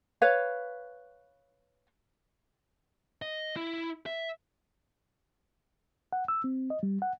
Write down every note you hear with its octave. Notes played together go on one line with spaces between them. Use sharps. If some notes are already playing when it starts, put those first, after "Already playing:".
B4 C#5 F5
D#5
E4
E5
F#5
E6
C4
D#5
G3
F#5